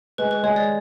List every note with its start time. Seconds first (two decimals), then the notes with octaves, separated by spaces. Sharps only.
0.18 G#3 B4
0.31 B4
0.43 G#3 C#5
0.56 D5